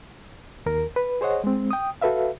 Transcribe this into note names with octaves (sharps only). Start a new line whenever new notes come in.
D#2 A#4
B4
G#4 C5 C#5 D#5 F#5
G#3 C4
G5 D#6
F#4 A4 B4 E5 F5